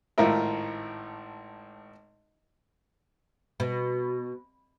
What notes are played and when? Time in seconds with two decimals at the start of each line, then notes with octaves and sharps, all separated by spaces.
0.18 G#1 A2 F4 A#4 E5
3.60 B2